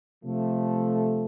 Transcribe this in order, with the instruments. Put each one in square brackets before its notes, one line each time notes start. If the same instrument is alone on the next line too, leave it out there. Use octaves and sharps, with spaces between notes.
[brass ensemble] C3 F3 A3